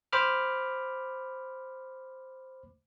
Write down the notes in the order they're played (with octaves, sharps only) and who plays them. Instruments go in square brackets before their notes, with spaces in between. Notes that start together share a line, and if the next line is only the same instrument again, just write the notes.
[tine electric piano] C5 B5 D6 F6